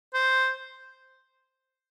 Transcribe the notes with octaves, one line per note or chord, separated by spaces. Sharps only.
C5